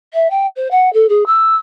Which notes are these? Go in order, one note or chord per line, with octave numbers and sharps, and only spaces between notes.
E5
G5
C5
F#5
A4
G#4
E6